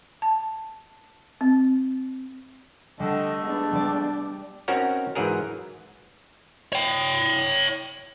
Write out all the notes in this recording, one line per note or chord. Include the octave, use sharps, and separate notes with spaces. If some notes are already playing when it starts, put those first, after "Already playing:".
A5
C4
D3 G3 A3 D#5
G#3 B3 D4
G3 D5
C4 C#4 D#4 F#4 A#4 C#5
G#2 E3 F#3 G#4 A#4
C#5 G5